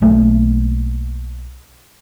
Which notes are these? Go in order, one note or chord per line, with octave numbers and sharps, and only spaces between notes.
B1 A3 A#3